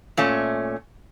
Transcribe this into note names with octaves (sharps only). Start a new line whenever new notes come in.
A#2 A3 C#4